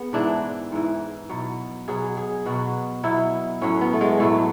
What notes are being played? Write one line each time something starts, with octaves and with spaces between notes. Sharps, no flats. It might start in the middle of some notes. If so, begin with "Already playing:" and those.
Already playing: B3 G#4
G#2 E3 D4
G#2 E3
B2 F#3
B2 F#3 G#4
G#4
B2 F#3 F#4
B2 F#3 E4
A2 F#3 C#4
B3
A3
G#3
A2 F#3 A3